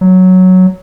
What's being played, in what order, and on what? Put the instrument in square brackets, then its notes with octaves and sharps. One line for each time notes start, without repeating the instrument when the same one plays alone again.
[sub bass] F#3